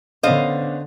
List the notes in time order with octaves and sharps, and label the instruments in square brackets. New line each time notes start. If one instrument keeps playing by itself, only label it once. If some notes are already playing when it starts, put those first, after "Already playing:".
[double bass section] D3 [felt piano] B3 C#4 D4 [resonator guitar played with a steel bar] C5 D#5 F5